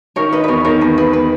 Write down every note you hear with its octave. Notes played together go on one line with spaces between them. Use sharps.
D#3 A#4 C#5
D#4 B4 D#5
B4
E2 A#4 C#5
D#3 A#4 C#5
E2 B4
E2 B4
B4